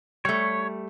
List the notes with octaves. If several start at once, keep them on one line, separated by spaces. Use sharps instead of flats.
G3 A3 C#5